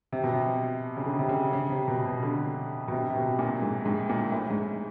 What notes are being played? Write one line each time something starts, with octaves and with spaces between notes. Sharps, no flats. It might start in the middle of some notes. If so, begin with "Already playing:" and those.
C3
B2
C3
C#3
D3
C3
C#3
C#3
C3
B2
B2
D3
B2
C3
C3
B2
A#2
G#2
G#2
A#2
A2
G#2